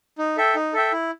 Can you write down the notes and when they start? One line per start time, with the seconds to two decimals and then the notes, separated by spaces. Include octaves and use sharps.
0.18 D#4
0.37 A4 E5 G5
0.55 D#4
0.73 A4 E5 G5
0.92 E4